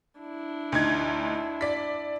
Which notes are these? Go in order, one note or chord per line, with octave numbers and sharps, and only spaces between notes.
D4 E4
D2 D#4 G#6
D5 B6